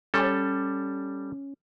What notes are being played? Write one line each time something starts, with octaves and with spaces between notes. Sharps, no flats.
G3 C#4 A4